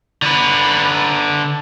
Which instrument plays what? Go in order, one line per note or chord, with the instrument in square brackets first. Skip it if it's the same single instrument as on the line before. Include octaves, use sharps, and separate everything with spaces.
[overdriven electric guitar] D3 B4